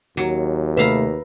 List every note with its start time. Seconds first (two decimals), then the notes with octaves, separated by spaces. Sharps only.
0.17 D#2 F#3
0.77 C3 A3 B4 E5 F5 A#5